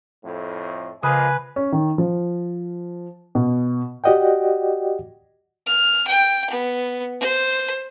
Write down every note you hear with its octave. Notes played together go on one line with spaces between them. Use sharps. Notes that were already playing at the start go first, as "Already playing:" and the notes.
F2 A2
C#3 F3 G#3 A#3 B4 G#5
C#4
D#3
F3
B2
F#4 G4 D5 D#5 F#5 G5
F6
G5
B3
C5